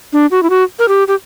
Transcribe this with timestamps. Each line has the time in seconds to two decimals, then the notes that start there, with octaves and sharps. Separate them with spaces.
0.13 D4
0.31 F#4
0.43 E4
0.50 F#4
0.79 A#4
0.88 G4
1.08 G4